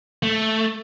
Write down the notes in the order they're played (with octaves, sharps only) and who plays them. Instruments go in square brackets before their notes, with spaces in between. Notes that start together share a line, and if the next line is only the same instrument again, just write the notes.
[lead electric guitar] A3